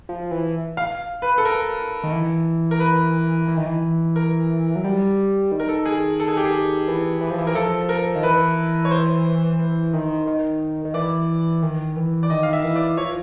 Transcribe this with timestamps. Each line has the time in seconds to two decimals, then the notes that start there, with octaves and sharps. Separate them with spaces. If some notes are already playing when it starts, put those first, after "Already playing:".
0.09 F3
0.31 E3
0.77 F5
1.22 B4
1.38 A4
1.45 A#4
2.04 D#3
2.12 E3
2.71 A#4
2.80 B4
3.48 E3
3.57 D#3
3.66 E3
4.16 A#4
4.76 F#3
4.84 G3
5.52 D#3
5.60 A#4
5.69 A4
5.86 G#4
6.20 A4
6.28 G#4
6.37 G4
6.45 G#4
6.88 E3
7.21 E3
7.30 F3
7.38 E3
7.47 A#4
7.55 F3 A4
7.89 A#4
8.15 D#3
8.23 E3 B4
8.85 C#5
8.91 C5
9.59 E3
9.93 D#3
10.27 D#3
10.85 D#3
10.94 E3 D5
11.62 D#3
11.96 E3
12.23 D5
12.30 D#3 D#5
12.43 F5
12.53 E5
12.63 E3
12.76 D5
12.97 F3 C#5